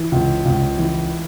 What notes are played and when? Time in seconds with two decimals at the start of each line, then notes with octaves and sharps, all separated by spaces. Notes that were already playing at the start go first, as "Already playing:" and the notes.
Already playing: E3
0.12 C#2
0.45 C#2
0.78 E3